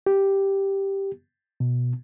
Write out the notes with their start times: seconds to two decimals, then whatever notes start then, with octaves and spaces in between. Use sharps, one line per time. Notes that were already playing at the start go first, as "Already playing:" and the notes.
0.06 G4
1.60 B2